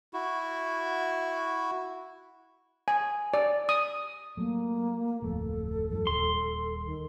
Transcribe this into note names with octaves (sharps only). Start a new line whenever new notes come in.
E4 F#4
G#5
D5
D#6
F#3 A3 A#3
D1 F2 A3 A4
E2 G2 F3
D#1 D#2 G3 C6
D#3